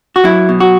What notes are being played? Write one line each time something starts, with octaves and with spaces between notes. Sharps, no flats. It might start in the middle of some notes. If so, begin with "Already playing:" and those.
F#4
F#3 E4
B2
F#4